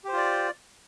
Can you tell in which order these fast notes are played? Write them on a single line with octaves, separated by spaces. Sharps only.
G4 C5 F4 D5